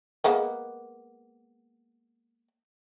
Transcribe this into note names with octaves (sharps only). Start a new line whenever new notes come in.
G#3 A#3 B3